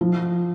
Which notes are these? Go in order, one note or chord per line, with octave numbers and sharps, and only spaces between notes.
F3